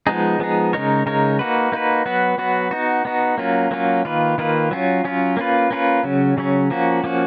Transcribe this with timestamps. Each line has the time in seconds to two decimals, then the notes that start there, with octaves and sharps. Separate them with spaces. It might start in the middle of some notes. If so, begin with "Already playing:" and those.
0.07 F3 G#3 B3 D#4 G#4
0.39 F3 G#3 B3 D#4 G#4
0.73 C#3 G#3 D#4 A#4 C#5
1.06 C#3 G#3 D#4 A#4 C#5
1.39 A#3 D#4 F#4 B4
1.72 A#3 D#4 F#4 B4
2.06 F#3 B3 F#4 B4
2.38 F#3 B3 F#4 B4
2.71 B3 D#4 F#4
3.05 B3 D#4 F#4
3.38 F#3 A#3 C#4 F4
3.71 F#3 A#3 C#4 F4
4.05 D#3 A#3 F4 B4
4.38 D#3 A#3 F4 B4
4.71 F#3 C#4 F4
5.05 F#3 C#4 F4
5.37 A#3 C#4 F4 B4
5.71 A#3 C#4 F4 B4
6.03 C#3 F#3 C#4
6.37 C#3 F#3 C#4
6.70 F3 A#3 C#4 F#4
7.04 F3 A#3 C#4 F#4